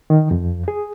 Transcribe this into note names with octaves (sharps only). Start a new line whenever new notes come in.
D#3
F2
G#4